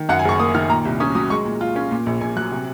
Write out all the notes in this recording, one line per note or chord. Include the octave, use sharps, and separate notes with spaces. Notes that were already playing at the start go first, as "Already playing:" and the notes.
Already playing: D#3
F#2 F#5
G#5
F#1 C#6
A#3 D#6
D#3 F6
A#2 A#5
C2
C#4 D#6
F#3 D#6
G#3 C#6
A#2
F4
C#4
A#2
A#1
A#1 G#5
F#3 F#6
C3